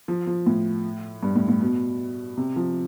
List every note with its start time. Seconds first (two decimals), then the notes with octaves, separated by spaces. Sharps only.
0.08 F3
0.27 F3
0.47 A2
1.23 G2
1.36 A2
1.48 A2
1.61 B2
2.37 C3
2.56 F3